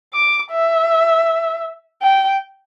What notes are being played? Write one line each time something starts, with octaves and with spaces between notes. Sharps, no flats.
D6
E5
G5